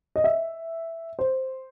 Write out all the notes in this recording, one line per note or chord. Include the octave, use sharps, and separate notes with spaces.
D#5
E5
C5